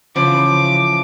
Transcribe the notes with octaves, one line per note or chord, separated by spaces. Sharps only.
C#3 E3 F3 D6